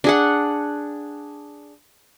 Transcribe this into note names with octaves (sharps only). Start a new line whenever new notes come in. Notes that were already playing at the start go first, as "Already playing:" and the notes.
D4 G#4 F#5